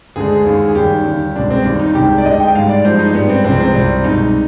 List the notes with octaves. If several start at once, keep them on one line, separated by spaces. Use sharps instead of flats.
D2 D3 G#3 G#4
D#2 D#3 G#3
G#4
D#2 D#3 G3 G4
D#2 D3 G3
C2 B2 G#3 D4
C4
D#2 D#3 G3 D4
D#4
C2 C3 D#3 G#3 G4
D5
D2 D3 G#3 D#5
G5
G#2 G3 F5
D5
G2 F3 G#3 C5
D#4
G#2 G3 B3
C4
C2 C3 F3 G#3 C4
C4
C2 C3 G3
C2 B2 G#3 D#4